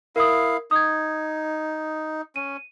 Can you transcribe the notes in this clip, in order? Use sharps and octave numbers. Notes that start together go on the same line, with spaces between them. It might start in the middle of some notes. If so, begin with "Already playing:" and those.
E4 A#4 F5 D#6
D#4 D#6 G#6
C#4 D#7